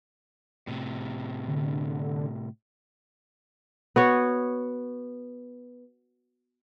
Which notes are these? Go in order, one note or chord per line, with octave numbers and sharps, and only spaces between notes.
A2 C3
D3
B3 F#4 C#5